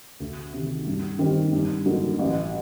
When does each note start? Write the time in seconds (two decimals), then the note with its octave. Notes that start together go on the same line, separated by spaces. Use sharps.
0.20 D2
0.54 C3 D#3
0.87 G2
1.19 D#3 G3 C4
1.53 G2
1.85 D3 F#3 A#3 D#4
2.19 A1